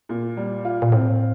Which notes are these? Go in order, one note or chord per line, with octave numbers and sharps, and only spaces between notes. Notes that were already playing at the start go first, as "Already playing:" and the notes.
A#2
G3
F4
A#2
A2 C4